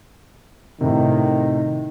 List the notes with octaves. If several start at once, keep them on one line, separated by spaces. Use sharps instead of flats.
A2 C3 D#3